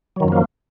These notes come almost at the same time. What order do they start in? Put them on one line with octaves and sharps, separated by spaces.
F#3 D#3 F#2 F3 A#3